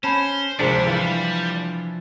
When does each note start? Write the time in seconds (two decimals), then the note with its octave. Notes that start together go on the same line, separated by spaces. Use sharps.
0.04 C#4 C5 A5 B5
0.59 G#1 C3 F3 G3 G#3 D4 C5 C#7
0.86 E3 F4